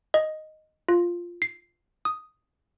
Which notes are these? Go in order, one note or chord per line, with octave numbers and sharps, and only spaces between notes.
D#5
F4
C7
D#6